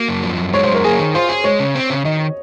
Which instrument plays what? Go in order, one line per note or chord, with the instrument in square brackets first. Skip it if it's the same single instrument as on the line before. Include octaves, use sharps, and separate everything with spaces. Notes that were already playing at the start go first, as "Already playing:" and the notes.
Already playing: [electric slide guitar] A#3 [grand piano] F#4
[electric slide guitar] F#2
F3
F#2
[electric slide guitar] G#3 [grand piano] C#5
[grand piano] C5
[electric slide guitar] F#2
[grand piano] A#4
[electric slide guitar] A#3 [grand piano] G#4
[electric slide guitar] D#3
[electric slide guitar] F4 [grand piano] C5
[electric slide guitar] G#4
[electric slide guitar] G#3 [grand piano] C#5
[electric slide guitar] C#3
C4
C#3
[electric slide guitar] D#3 [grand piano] D#5